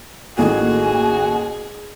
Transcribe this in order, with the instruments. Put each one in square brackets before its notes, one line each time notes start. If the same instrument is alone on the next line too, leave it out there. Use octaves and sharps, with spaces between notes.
[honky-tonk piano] A1 D#2 A4 [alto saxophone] F#4 [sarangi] G#4 [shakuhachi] G#5